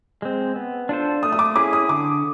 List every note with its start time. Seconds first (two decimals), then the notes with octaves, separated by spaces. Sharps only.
0.22 G#3 C4
0.56 B3
0.89 D4 F4 A4 C5
1.22 A3 D#6
1.32 D#6
1.39 D6
1.55 C#4 E4 G#4 D6
1.73 D#6
1.89 D3 D6